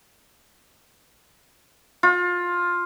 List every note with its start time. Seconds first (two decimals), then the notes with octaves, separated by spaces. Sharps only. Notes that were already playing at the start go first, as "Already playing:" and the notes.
2.03 F4